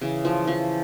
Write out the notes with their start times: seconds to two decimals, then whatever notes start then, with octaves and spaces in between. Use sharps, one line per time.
0.01 C#3 E3
0.25 F3
0.47 F3